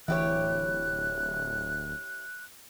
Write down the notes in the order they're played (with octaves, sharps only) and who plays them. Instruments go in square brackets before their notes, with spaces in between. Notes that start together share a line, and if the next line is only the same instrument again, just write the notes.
[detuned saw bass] D1 [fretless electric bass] E3 [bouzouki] E4 G4 C#5 [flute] F#6